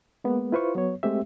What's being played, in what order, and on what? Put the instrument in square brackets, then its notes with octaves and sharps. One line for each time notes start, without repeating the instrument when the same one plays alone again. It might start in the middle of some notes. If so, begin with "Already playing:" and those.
[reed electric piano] G#3 A#3 B3
E4 F4 B4 C5 F5 C#6
F#3 B3 C#5
G#3 A3 C4 G4 E5